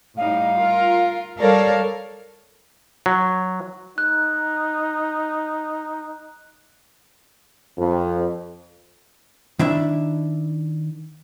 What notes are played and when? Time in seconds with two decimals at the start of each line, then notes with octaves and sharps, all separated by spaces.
0.17 A2 G3 D#4 F5
0.57 F4 A#4
1.39 G3 A4 A#4 C#5 D5 F5
3.06 F#3
3.98 D#4 F#6
7.77 F2
9.59 D#3 D4 E4 E5